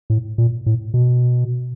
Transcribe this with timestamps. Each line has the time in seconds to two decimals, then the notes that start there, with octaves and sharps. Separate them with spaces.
0.10 A2
0.38 A#2
0.66 A2
0.94 B2